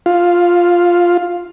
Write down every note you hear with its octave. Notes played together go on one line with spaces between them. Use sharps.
F4